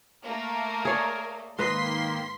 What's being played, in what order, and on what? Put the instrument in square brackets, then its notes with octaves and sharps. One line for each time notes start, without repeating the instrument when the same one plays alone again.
[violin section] A3 A#3 [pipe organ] A#4
[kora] G#4 C#5 D5
[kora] G#2 B4 D#5 [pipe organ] D#3 A#3 [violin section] C6 B6 C7